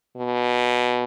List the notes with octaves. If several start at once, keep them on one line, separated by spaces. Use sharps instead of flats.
B2